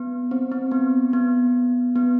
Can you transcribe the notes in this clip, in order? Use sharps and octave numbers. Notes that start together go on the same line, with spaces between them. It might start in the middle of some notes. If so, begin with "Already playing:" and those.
Already playing: B3
C4
C4
B3
B3
B3